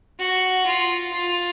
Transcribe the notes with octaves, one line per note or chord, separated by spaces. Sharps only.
F#4
F4
F4